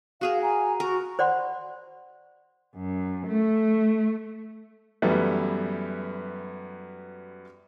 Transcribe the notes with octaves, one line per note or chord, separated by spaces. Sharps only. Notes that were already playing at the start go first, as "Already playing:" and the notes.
F#4 G#4 A#4 F5
G#5 A#5
F#4 A#4
C5 D5 F#5 B5 C6
F#2
A3
F#2 E3 G3 A3 B3